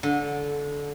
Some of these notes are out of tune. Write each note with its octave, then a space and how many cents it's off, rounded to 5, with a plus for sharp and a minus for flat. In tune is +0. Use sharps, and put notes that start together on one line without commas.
D3 -20